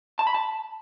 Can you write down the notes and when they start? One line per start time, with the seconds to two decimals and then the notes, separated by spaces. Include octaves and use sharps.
0.19 A5
0.27 B5
0.34 A5